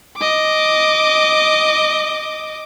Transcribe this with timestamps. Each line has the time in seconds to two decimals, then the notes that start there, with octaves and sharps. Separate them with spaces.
0.17 D#5 D6